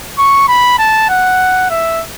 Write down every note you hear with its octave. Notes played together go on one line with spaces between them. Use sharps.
C#6
B5
A5
F#5
E5